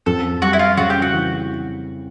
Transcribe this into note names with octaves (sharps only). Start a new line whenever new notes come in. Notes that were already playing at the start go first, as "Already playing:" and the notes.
F2 A4
G3 F#4
E4
F4
C#3 F#4
G4
F#4
E3